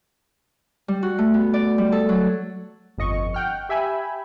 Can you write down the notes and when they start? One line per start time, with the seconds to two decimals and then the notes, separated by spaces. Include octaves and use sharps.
0.88 G3
1.03 F#4
1.18 A3
1.34 B3
1.54 D5
1.78 G3
1.92 A4
2.09 F#3
2.98 G1 F2 D#5 C#6
3.34 F#5 G5 F6
3.69 G4 E5 G5 G#5 B5